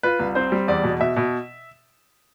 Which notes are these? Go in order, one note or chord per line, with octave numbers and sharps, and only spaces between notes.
F4 B4
C2
C4 C5
G3
E2 D5
B2
B2 E5
B2